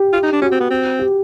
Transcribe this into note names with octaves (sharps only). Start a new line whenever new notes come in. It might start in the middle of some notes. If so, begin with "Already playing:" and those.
Already playing: G4
F4
D#4
D4
C#4 F#4
C4
B3
C4
G4